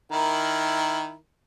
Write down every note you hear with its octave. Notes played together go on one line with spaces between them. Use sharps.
D#3 E4 A#4